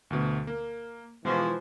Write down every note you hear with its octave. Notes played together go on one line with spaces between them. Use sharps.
D2 B2
A#3
B2 E3 F3 G#3 F#4